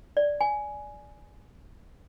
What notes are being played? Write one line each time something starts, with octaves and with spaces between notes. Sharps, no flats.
D5
G#5